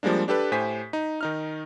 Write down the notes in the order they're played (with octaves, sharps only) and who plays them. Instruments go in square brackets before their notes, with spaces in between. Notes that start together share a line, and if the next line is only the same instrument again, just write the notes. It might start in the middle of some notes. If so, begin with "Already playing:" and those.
[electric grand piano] F3 G3 G#3 A#3 D4
D4 G4 A4 B4
A2 G4 C5 G#5 B6
D#4
D#3 D#4 F6